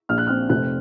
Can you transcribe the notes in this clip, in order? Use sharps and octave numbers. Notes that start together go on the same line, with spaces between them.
A#1 F6
F#6
C4 F6
F1 F#6